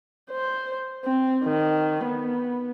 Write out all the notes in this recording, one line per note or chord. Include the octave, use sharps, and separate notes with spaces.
C5
C4
D#3
B3